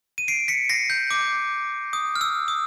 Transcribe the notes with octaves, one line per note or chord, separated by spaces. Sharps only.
D#7
C7 D7
B6 C#7
A#6 C7
G6
D6
D#6
F6
E6
D#6